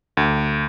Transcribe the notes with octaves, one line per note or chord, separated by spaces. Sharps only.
D2